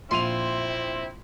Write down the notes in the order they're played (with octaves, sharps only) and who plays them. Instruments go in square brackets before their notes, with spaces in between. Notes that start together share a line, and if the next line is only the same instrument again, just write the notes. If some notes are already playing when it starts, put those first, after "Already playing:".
[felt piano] A#1 E5 [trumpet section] C4 E4 [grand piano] F4 D#7 F7 [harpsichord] C6